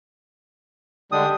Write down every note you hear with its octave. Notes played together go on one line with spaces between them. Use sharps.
D3 G3 G#3 D4 D#6